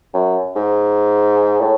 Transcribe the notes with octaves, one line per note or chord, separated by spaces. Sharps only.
F#2
G#2
A2